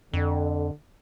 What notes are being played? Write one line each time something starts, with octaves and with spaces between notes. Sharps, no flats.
F2 D3